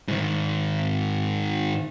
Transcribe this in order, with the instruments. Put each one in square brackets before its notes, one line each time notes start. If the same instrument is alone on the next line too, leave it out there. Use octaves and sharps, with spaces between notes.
[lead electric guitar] G#2 D#3